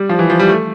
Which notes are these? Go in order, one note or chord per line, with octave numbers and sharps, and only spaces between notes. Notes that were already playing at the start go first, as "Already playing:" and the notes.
Already playing: G3
F3
E3
F3
G3
A3